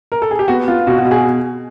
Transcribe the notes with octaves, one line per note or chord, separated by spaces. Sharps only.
A#4
A4
G#4
G4
B3 F#4
B3 F4
B2 F#4
F#4
B2
G#4